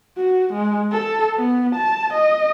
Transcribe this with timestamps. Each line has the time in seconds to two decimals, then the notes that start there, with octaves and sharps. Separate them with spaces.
0.17 F#4
0.53 G#3
0.92 A4
1.37 B3
1.76 A5
2.14 D#5